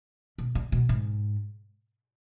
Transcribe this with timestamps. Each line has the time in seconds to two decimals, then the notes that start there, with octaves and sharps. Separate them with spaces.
0.38 B2
0.55 D3
0.72 B2
0.89 G#2